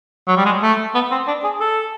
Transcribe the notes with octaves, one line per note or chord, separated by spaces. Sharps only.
F#3
G3
G#3
A3
B3
C4
D4
G#4
A4